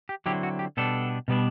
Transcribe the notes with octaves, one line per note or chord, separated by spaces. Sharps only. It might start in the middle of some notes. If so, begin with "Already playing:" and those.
G4
D3 F#3 C4 E4 G4
F#4
G4
B2 G3 B3 D4 A4
B2 G3 B3 D4